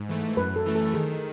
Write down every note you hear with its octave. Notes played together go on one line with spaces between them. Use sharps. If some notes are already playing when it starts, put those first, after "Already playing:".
Already playing: G#2
E3 A3
F#2 B4
A4
E3 A3
A4
D#3 G#4